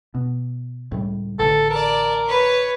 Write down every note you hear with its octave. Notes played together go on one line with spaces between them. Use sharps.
B2
C#2 A2 G3
A1 D3 A4
A#4 D5 A5
B4 C#5